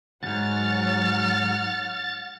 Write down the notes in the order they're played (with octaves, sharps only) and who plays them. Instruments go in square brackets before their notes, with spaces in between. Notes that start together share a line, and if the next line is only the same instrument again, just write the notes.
[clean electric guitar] D2 G#2 [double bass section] F#3 [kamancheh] F#5 F6 [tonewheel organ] A6